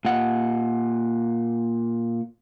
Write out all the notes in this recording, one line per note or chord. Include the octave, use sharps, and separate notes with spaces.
A#2 F#5